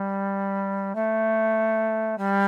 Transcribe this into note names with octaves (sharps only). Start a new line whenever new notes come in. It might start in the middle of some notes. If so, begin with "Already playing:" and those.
Already playing: G3
A3
G3